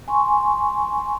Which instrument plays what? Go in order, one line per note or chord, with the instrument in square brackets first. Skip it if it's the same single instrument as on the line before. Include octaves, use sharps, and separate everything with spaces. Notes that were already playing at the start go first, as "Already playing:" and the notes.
[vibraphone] G#5 C6 C#6